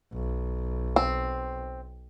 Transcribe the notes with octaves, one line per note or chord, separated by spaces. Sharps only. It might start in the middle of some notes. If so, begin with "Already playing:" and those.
B1
C4